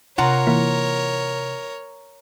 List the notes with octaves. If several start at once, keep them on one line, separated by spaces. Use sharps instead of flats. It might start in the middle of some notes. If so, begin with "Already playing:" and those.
C3 F4 A#4 C#5 F#5 A#5
E3 A#3 E4